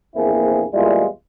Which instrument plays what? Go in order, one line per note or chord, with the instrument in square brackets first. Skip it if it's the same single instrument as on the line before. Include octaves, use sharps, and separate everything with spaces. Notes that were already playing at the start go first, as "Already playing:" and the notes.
[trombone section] A#1 E2 A#3 C4 E4 G#4
E2 A#2 G3 G#3 E4 F4